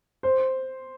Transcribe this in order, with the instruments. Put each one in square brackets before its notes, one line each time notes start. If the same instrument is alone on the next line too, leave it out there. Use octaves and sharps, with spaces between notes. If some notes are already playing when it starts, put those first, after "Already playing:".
[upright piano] C5